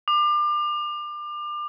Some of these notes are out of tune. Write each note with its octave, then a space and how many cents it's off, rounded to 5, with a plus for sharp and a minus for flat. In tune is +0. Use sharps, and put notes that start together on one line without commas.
D6 +30